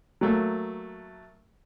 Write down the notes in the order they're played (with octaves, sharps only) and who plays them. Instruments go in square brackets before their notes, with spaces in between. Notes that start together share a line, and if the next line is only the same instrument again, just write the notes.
[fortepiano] F#3 A3 A#3